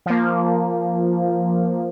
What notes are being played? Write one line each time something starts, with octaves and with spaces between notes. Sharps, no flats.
F3 A#3